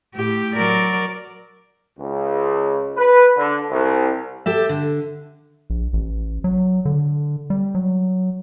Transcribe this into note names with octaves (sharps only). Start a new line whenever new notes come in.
A2 G4
F#3 A#4 D5
C#2
B4
D3
C2
G4 A4 E5
D3
A#1
A1
F#3
D3
G3
F#3